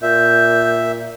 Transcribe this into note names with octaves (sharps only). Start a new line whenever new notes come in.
A#2 E5 G6